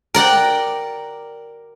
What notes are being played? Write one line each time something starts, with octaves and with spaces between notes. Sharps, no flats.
A#4 D5 F#5 G5